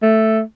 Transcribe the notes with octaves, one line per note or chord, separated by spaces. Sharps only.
A3